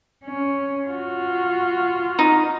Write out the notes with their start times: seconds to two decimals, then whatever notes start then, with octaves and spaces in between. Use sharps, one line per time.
0.24 C#4
0.88 F4 F#4
2.19 D#4